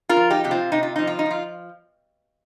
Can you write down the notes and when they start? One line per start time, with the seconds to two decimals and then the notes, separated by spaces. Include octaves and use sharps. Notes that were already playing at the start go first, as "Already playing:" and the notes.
0.09 F4 A#4
0.17 F3
0.30 D#4 G4
0.44 C3 G4
0.51 C4 F4
0.72 C3 D#4
0.83 F4
0.96 F3 D#4
1.07 F4
1.19 D#4
1.26 F3 F4